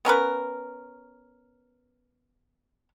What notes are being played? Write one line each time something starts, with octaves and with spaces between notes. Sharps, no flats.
B3 C#4 A#4 B4